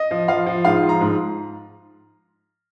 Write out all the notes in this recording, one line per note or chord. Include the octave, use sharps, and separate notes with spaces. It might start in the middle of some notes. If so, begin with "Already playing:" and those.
Already playing: D#5
F3
F3 F5
F3
G#2 F5
F3
A#5
G#2